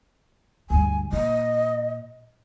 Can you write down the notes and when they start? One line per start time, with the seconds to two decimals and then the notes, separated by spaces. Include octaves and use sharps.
0.70 D2 G2 G#5
1.12 A#2 D#5